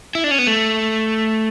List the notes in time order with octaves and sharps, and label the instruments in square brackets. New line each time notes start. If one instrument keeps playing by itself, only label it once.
[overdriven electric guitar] E4
D4
C#4
B3
A3